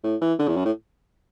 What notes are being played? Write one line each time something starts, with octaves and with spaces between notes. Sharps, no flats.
A2
E3
D3
E2
F#2
A2